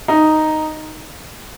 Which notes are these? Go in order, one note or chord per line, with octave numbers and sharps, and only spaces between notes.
D#4